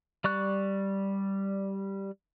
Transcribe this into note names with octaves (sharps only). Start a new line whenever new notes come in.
G3 D5 C#6 F#6